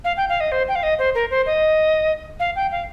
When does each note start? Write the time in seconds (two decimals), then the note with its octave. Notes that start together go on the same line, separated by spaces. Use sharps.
0.04 F5
0.17 G5
0.29 F5
0.40 D#5
0.52 C5
0.68 G5
0.75 F5
0.83 D#5
0.99 C5
1.15 A#4
1.30 C5
1.46 D#5
2.40 F5
2.56 G5
2.71 F5